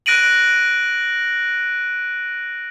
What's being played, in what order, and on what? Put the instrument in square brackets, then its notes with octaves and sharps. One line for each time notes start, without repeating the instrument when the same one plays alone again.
[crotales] F#6 A#6 D7 D#7 F#7